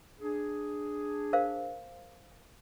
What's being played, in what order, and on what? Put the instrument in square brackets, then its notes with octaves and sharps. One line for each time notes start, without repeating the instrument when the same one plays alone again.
[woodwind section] D4 G#4
[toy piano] A#4 C5 F5